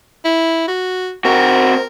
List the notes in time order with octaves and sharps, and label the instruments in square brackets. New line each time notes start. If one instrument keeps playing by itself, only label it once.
[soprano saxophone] E4
F#4
[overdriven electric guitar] C4 F#4 [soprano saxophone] A#4